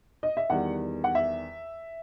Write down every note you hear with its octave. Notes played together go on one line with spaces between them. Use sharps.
D#5
E5
E2 D#3 G3 F#5
F#5
E5